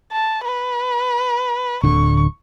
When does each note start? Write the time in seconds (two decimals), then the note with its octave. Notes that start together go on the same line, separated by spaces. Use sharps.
0.12 A5
0.45 B4
1.83 D1 D3 C#6